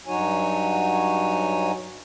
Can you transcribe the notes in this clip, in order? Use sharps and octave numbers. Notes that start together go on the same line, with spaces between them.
G2 F#3 D#4 F#4 C#5 G#5